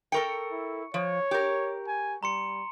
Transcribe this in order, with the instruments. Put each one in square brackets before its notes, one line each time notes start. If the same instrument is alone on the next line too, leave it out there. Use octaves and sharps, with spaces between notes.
[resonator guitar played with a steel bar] A4 A#4 G5 [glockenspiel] C#6 C#7
[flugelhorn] E4
[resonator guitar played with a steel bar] F3 [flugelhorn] C#5
[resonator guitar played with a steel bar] G4 A#4
[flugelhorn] G#5
[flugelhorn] G3 [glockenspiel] A#5 C6 C#7